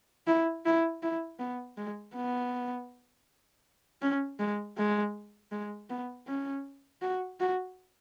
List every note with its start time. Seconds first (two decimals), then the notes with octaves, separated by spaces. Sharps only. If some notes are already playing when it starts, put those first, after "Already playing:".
0.27 E4
0.65 E4
1.03 E4
1.39 B3
1.78 G#3
2.15 B3
4.02 C#4
4.40 G#3
4.78 G#3
5.52 G#3
5.90 B3
6.27 C#4
7.02 F#4
7.40 F#4